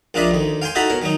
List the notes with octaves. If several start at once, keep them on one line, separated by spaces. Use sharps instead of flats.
A#1 A#3 D4 F4 D#5 E5
D2 D#3
F5 G5 G#5 C6
D#4 E4 F#4 A4 A#5 B5
B2 A#4 C#5
D#3 F#3 D#4